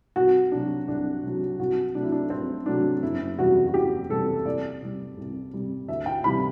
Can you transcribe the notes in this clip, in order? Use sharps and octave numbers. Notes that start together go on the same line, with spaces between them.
C2 F#4
C3 F#3 D4
C2 D4
C3 F#3
C2 F#4
C3 F#3 A3 D4
E4
D4
C2 C4
C3 F#3 A3 D4
F#1 E4
E2 C3 G3 F#4
F#4
F#1 G4
E2 C3 G3 A4
C2 D5
C3 G3
C2
C3 G3
D2 E5
G5
C3 E3 G3 B5